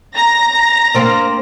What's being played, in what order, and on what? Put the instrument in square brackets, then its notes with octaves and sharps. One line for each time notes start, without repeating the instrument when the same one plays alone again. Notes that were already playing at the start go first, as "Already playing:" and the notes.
[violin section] A#5 A#6
[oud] A#3 C4 D4